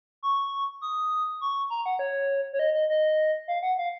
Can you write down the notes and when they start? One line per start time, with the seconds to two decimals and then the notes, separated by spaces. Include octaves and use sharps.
0.23 C#6
0.82 D#6
1.41 C#6
1.70 A#5
1.86 F#5
1.99 C#5
2.53 C#5
2.59 D#5
2.74 D#5
2.89 D#5
3.48 F5
3.63 F#5
3.78 F5